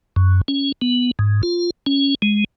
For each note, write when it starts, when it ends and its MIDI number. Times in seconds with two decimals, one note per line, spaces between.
0.16 0.41 42
0.48 0.72 61
0.82 1.11 59
1.19 1.42 44
1.43 1.70 65
1.86 2.15 61
2.22 2.44 56